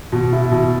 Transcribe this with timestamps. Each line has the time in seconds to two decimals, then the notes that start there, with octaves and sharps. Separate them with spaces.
0.12 B2
0.33 E4
0.52 B2